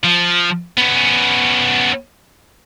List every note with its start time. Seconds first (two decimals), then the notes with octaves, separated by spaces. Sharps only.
0.04 F3
0.77 B3 C#4